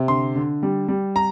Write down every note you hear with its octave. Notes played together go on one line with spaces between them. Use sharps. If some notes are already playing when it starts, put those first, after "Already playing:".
Already playing: C3
D3 C6
D3
G3
G3
A#5